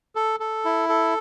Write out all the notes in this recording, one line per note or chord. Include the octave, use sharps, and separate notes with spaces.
A4
A4
E4
A4